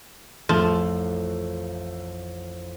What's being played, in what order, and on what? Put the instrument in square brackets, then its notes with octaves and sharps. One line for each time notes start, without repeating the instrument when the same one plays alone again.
[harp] A1 F2 [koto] F3 [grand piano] A3